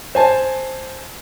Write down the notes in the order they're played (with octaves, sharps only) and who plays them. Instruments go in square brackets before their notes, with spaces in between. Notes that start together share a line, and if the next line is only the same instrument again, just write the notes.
[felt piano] C5 G#5 A5